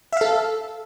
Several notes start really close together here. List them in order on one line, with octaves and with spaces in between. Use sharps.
E5 F5 A4